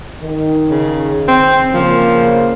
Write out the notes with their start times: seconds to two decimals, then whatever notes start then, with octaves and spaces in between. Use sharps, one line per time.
0.22 D#3
0.70 C#3
1.28 C4
1.74 C#3 F3 A#3